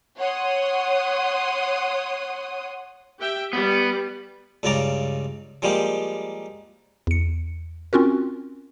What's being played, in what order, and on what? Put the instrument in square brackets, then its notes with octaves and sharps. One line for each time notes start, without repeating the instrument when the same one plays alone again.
[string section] C#5 F#5 C6 D#6
[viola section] G4 E5 G5
[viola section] G3 [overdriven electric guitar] B3
[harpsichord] C#2 G2 C#3 A5 A#5 D6
F3 G3 G#3 A#3 G4
[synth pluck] E2 C#7
C4 C#4 F4 F#4 A#4